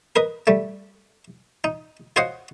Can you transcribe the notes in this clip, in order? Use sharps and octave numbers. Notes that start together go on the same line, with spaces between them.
A#4 B4 D#5
G3 A3
D#4
F#4 C5 C#5 D#5 F5 F#5